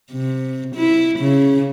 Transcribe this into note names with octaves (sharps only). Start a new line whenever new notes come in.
C3
E4
C#3